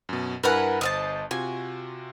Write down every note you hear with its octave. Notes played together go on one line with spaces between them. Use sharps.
F#2 B2
G2 E4 A#4 B4 F#5 G#5
G1 C5 D#5 F5 A5
C3 F4 F#4 G#5